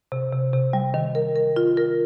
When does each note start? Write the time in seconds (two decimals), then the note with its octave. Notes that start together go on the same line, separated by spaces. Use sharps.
0.12 C3
0.33 C3
0.53 C3
0.73 G3
0.94 D#3
1.15 A#4
1.36 A#4
1.56 F4
1.77 A#4